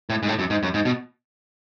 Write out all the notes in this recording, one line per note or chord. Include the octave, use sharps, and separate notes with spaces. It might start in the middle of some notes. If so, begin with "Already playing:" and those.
A2
G#2
A2
F#2
G#2
F#2
G#2
B2